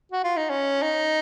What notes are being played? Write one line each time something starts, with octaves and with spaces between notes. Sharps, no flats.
F#4
F4
D#4
C#4
D#4